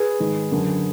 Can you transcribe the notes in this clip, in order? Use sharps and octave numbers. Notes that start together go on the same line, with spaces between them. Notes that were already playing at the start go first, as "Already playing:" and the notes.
Already playing: G#4 B4
G#2 D#3
F#2 D3